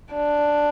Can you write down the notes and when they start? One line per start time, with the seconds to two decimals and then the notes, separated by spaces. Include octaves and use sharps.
0.13 D4